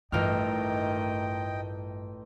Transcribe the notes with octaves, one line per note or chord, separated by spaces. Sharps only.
A1 G2 D#3 A3 F4 D#5 G5 F6